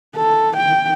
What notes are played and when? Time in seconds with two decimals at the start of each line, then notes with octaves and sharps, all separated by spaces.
0.15 A4
0.57 G5